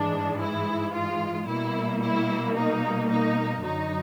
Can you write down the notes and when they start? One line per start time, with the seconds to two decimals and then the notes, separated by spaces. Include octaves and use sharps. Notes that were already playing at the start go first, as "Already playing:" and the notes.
Already playing: G#2 E3 G#3 D4
0.40 E4
0.93 F4
1.47 B2 G3 A#3 E4
2.01 E4
2.56 D#4
3.10 D#4
3.63 F#2 D3 F#3 D#4